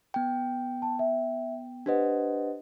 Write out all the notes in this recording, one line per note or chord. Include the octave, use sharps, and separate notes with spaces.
B3 G5
A5
E5
D4 G4 B4 C5 D#5 F#5